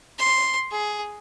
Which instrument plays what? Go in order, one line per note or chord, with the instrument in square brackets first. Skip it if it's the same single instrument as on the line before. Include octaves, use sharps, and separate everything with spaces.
[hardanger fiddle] C6
G#4